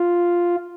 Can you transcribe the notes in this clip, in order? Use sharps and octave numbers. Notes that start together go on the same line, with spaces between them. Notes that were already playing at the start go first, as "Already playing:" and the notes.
Already playing: F4